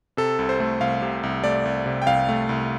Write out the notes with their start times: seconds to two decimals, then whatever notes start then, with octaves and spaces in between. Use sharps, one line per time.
0.17 C3 A4
0.39 C2
0.49 C5
0.60 A3
0.81 C2 F5
1.02 C3
1.23 C2
1.44 A3 D5
1.65 C2
1.86 C3
2.02 G5
2.07 C2 F5
2.29 A3
2.49 C2